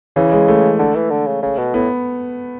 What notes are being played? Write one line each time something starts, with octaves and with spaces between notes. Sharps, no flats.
C#3 E3
G#3
A3
D3
E3
D3
C#3
C#3
B2
A2 B3